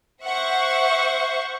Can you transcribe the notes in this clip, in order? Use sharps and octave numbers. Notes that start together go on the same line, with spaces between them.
C5 E5 F#5 C#6